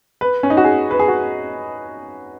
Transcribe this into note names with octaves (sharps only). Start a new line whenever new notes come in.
B4
C#4
D#4
F#4
G#4
B4
G#4
F#4